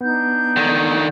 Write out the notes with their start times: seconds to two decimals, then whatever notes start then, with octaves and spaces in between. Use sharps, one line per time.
0.01 B3 D4 D#4 G6
0.56 D3 D#3